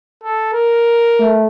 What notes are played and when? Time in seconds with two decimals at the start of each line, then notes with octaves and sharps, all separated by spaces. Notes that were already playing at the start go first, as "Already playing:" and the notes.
0.24 A4
0.53 A#4
1.19 A3